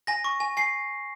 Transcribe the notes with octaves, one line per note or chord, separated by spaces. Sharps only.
G#5 A#6
C#6
G#5
G#5 C7